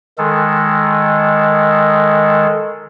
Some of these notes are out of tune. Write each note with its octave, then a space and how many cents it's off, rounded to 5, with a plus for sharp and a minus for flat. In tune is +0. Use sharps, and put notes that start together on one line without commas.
D#3 +0 G#3 +0 A4 +0